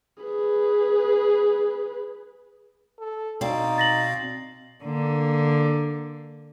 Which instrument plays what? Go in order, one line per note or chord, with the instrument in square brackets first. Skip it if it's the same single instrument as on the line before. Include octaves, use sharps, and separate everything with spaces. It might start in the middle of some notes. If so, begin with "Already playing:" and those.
[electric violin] G#4 B4
[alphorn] A4
[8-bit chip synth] B2 F5 [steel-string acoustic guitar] C4 D5 [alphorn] D#4
[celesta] A6 A#6 F#7
[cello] D3 A#3